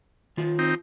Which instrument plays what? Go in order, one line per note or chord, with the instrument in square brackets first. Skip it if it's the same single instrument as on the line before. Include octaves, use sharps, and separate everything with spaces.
[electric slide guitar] D#3 F4
[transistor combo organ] C4 D#4